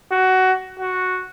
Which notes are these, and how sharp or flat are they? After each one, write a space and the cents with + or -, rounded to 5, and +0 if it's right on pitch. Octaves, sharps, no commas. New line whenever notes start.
F#4 +15
F#4 -5